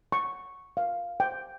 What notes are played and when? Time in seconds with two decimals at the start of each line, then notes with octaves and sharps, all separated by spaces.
0.12 C#6
0.77 F5
1.20 G5